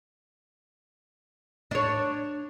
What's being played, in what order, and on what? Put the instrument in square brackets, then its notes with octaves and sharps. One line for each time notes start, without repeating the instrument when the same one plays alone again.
[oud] D4 C#5